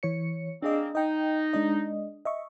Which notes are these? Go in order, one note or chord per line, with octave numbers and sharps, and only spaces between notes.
E3 C#5 C#7
A#3 C4 D4 G#4 D#5
D#4 D#5 G5
G#3 D4 D#5
D#5 E5 C#6